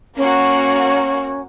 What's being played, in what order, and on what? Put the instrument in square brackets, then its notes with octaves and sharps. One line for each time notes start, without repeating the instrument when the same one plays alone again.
[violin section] A#3 F#4 [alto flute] C#4